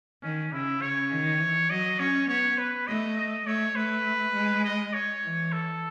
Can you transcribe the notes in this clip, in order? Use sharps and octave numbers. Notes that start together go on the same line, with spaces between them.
D#3 C#4
C#3 E4
C#3 C#5
D#3
E3
F#3 D#5
C#4 C#5
B3 C#5
B4
A3 D#5
D#5
A3 C#5
A3 B4
G#3
D#5
C#5
E3
A4